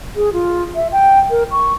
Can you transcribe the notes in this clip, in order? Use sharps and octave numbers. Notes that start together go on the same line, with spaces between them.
G#4
F4
E5
G5
A#4
C#6